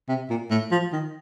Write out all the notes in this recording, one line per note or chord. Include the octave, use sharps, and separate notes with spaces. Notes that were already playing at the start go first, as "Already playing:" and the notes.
C3
A#2
A2
F3
D#3